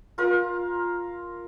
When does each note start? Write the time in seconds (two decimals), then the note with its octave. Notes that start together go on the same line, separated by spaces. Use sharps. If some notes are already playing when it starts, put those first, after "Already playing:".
0.18 F4 A#4